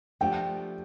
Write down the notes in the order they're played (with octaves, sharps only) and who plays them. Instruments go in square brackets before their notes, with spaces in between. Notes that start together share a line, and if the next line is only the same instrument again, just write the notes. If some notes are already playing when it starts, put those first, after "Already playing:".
[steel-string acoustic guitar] F3 A3 D4 G4 [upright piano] G5